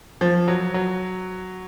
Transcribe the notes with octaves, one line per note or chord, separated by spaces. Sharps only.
F3
F#3
F#3